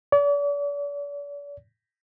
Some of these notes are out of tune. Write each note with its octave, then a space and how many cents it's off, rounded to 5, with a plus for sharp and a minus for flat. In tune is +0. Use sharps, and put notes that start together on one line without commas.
D5 -40